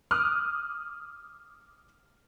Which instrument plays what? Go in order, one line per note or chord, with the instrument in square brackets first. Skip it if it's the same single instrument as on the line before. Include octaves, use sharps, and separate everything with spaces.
[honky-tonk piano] D6 D#6 F6 F#6